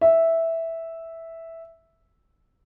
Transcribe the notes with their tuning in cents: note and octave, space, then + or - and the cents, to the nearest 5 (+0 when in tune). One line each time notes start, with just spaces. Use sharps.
E5 -5